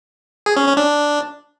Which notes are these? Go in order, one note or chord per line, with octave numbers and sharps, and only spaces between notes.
G#4
C#4
C#4
D4